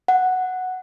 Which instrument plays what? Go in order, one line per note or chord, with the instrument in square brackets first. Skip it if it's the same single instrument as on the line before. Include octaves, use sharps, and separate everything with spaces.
[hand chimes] F#5